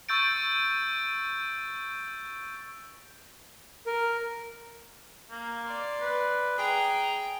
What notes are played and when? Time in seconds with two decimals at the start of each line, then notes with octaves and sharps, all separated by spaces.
0.09 C#6 E6 G6 A6 D7
3.86 A#4
5.31 A#3
5.66 D5 C6
6.01 B4
6.58 G#4 G5 A#5